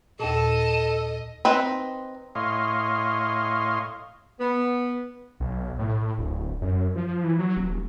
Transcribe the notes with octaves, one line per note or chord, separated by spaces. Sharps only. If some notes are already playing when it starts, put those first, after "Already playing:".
D#2 A#2 A4 D#5 A5
C4 D#4 B4
A2 C#5 D#5 F5 C6
B3
B1
A2
D1
F#2
F3
E3
F#3
D#1